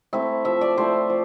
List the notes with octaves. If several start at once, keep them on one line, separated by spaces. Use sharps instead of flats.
A3 C4 E4 E5
F3 E5
D5
A3 C4 E4 C5
F3